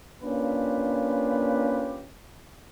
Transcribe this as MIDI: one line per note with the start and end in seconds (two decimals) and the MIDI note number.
0.21 2.07 58
0.21 2.07 61
0.21 2.07 62
0.21 2.07 65
0.21 2.07 67
0.21 2.07 71